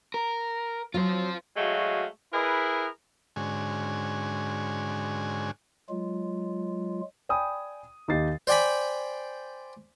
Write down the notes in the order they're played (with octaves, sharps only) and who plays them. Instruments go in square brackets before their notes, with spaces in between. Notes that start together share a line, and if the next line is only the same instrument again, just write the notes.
[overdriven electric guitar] A#4
[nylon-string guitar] F#3 C4 [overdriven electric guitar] F4 C5
[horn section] F#3 G#3 A3 F#4 F5
E4 G#4 A#4 B4
[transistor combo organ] G#2 D3 G#3 C#4 F#4 G#5
[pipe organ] F#3 G#3 F4
[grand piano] D5 G5 G#5 B5 D#6
D#2 D#4 G4 F5 A6 C7
[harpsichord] C5 D5 G5 G#5 B5